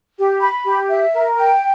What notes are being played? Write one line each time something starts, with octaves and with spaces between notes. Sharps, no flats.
G4
B5
G4
E5
A#4
G5